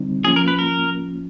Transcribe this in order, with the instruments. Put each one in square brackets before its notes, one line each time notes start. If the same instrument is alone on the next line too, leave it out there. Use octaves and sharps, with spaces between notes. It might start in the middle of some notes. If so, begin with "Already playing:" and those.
Already playing: [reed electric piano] D3 G3 C4 D#4
[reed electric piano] F3 A#3 C#4 F4 [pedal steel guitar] G#4
[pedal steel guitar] A#4
B4
A#4